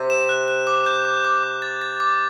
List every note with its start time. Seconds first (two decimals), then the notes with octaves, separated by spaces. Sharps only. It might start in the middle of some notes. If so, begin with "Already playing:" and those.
Already playing: C3
0.10 E7
0.29 F#6
0.48 F#6
0.67 D6
0.86 G6
1.05 D6
1.25 D6
1.43 D6
1.62 A6
1.82 A6
2.00 D6